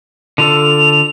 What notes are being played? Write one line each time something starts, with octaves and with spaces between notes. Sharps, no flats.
D3 F4 A4 F7